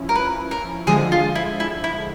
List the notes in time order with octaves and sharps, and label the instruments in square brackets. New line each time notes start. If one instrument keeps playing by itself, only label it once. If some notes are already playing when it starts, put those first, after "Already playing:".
Already playing: [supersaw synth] F3 C#4 E4
[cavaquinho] A#4
B4
A#4
[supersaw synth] D3 F3 G#3 [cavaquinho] G#4
[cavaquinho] F4
E4
E4
E4